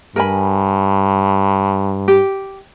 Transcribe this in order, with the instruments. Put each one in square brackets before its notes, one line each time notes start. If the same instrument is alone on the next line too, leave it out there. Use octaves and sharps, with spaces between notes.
[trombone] G2 [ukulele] A#4 G#5 B5
[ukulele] G4